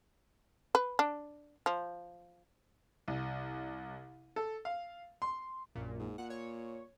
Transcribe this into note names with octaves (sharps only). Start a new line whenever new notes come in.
B4
D4
F3
C2
A4
F5
C6
A#1 F#2 A#2
G#2
A#2 F#5
C#5